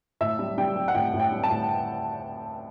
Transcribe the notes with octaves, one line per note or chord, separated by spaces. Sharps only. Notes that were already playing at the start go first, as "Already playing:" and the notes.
A2 E5
G3
G3 G5
G3
F#5
A2 G5
A2
G5
G3
A5
A2